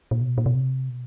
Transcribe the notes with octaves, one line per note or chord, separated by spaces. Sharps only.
A#2
B2
A#2
B2
C3
B2